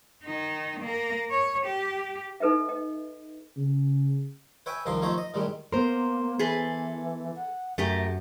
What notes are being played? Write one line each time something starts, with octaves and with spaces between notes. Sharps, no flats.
D#3 D#4
A#3 A#4
C#5
G4
D#4 A4 B4 D#5 E5
D#5
C#3
B4 C#5 E5 G5 G#5
C2 F2 D#3 F3 D#4 C6
F3 A3 D#4 C5 C#5 E5
D#5
A2 D#3 G3 G#3
A#3 B3 A#4 C5 C6
E3 G#4 A4 B4
F#5
F#2 A3 G4 A#4 E5